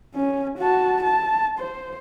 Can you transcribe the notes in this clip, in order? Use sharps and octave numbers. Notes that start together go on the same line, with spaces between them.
C#4
F#4 A5
A5
C5